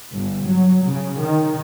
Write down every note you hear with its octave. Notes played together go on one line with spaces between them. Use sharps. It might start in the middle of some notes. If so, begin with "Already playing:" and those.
G1
F#3
C#3
D#3